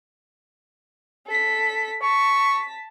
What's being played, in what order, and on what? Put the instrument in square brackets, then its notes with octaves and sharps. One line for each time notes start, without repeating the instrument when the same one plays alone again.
[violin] A4 B6
[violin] A5 B6 [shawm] C#6